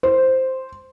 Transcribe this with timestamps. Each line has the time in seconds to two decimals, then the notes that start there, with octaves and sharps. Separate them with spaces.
0.03 C5